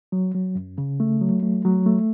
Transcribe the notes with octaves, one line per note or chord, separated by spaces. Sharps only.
F#3
F#3
F#2
C#3
A3
F#3
A3
F#3
A3